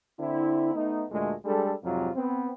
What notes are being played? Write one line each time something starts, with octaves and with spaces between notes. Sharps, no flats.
D3 C4 E4
A3 B3 D#4
D2 A#2 G#3 A3
G3 G#3 D4 A4
F2 G#2 C3 F#3 F4
B3 C4